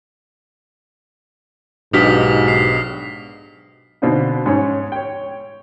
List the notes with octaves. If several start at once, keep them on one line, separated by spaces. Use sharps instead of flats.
B1 G#2 B2 D4 G4 D#6 F6 B6
C7
B2 D3 C4 D4 D#4 F4
G#2 C#4 D#4 C#5
C#5 G5